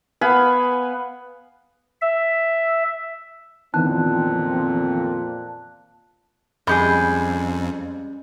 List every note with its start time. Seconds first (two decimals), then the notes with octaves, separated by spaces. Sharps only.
0.21 B3 F5 G#5 B5
2.01 E5
3.74 F2 A#2 D#3 E3 B3 C4 A5 F#6
6.67 F2 G3 G#3 C#4 G#4 D#5 B5 G6